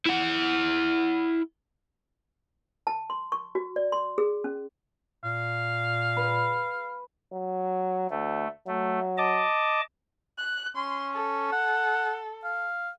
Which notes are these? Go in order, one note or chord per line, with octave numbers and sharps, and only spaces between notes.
E4 F#5
A5
C6
C#6
F#4
D5
C6
G#4
C#4
A#2 F5
B4
F#3
D2 A3
F#3 A3
D#5 A5 D6
F#6
C#4 C6
A4
F#5
F5